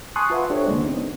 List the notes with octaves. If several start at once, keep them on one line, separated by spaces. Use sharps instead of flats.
G#5 A5 C6 C#6 D#6 F#6
F4 B4 E5 F#5
D4 G4 A4 C5 C#5
D#2 C#3 G#3 A#3 D4
B3 C4 D#4